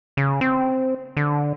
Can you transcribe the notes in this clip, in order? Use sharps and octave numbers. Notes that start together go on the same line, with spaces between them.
C#3
C4
D3